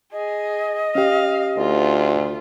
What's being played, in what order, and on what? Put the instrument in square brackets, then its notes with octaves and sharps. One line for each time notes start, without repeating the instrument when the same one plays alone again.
[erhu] G#4 [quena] D#5
[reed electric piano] C#4 G4 [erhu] F5
[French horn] D2 [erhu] F4